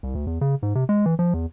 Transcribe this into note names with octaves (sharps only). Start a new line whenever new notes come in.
C2
D2
E2
C#3
G#2
C3
G#3
E3
F3
E2